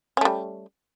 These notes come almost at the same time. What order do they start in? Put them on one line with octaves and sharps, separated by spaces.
C#4 A3 G3